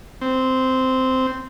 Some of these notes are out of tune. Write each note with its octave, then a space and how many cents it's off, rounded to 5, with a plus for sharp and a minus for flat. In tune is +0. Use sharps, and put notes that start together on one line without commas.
C4 -10